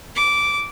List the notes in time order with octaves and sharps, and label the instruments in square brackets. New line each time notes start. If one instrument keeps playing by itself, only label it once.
[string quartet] D6